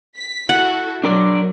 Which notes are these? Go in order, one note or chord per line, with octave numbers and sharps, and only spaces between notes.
B6
E4 F#4 A4 F#5
B2 F#3 D4 A#4 D5